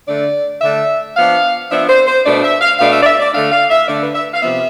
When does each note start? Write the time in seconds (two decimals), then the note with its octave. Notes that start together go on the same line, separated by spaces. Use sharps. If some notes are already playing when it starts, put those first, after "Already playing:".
0.08 D3 A3 D4 D5
0.62 D3 A3 D4 E5
1.17 F3 B3 D4 F5
1.71 F3 B3 D4 E5
1.89 C5
2.07 C5
2.25 B2 A3 D4 D5
2.44 E5
2.61 F5
2.79 B2 A3 D4 F5
2.93 E5
3.02 D5
3.06 E5
3.20 D5
3.34 D3 A3 D4 F5
3.52 F5
3.70 E5
3.88 D3 A3 D4 D5
4.02 B4
4.15 E5
4.34 F5
4.42 C3 F3 B3 E5